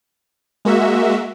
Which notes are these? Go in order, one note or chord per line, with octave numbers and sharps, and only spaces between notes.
G#3 A#3 F#4 E5